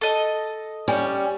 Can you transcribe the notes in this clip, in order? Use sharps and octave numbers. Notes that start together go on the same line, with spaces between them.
A4 D#5
G3 C#4